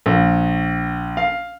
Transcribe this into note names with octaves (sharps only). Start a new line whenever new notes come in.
A#1
F5